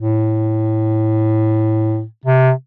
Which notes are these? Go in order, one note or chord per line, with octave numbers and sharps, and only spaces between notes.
A2
C3